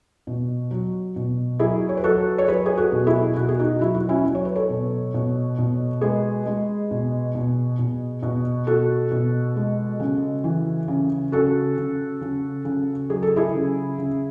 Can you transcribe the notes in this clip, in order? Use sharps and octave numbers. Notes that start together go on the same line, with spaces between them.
B2
F#3
B2
F#3 E4 G#4
C#5
B4
F#3 F#4 A4
C#5
F#3 G#4 B4
G#4
F#4 A4
B2
E4 G#4
B2 F#4
G#4
D#4 F#4
F#3 E4
F#4
C#4 E4
F#3
C#5
B4
A4 C#5
B2
B2
B2
G#3 G#4 B4
G#3
B2
B2
B2
B2
B2 F#4 A4
B2
G#3
C#3
E3
C#3
C#3 F#4 A4
C#3
C#3
C#3
F#3 G#4
A4
E4 G#4
C#3
C#3